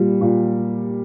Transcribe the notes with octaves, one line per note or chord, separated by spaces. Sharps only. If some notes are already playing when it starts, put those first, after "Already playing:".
Already playing: A#2 G3
A#2